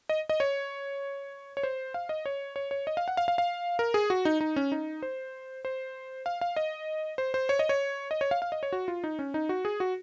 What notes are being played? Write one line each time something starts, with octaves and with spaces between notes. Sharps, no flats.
D#5
D#5
C#5
C#5
C5
F5
D#5
C#5
C#5
C#5
D#5
F5
F#5
F5
F5
F5
A#4
G#4
F#4
D#4
D#4
C#4
D#4
C5
C5
F5
F5
D#5
C5
C5
C#5
D#5
C#5
D#5
C#5
F5
F5
D#5
C#5
F#4
F4
D#4
C#4
D#4
F#4
G#4
F#4